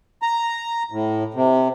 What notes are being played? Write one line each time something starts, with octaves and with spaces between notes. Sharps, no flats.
A#5
A2
C3